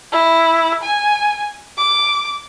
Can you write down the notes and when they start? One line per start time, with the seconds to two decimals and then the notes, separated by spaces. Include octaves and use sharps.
0.12 E4
0.83 G#5
1.78 D6